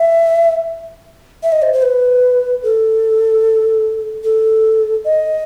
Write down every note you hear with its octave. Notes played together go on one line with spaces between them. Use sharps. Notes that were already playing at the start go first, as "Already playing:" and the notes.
Already playing: E5
E5
D#5
C5
C5
B4
A4
A4
D#5